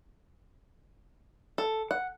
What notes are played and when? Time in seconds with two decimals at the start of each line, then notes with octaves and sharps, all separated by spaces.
1.58 A4
1.91 F#5